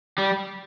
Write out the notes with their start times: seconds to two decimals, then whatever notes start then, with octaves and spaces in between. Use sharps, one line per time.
0.18 G3